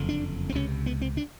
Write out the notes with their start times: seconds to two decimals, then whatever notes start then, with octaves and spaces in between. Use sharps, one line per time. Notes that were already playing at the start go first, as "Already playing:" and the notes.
Already playing: F#1 F2 D3
0.09 D4
0.49 C4
0.55 C#2 C3 C#4
0.86 B3
1.01 C4
1.17 D4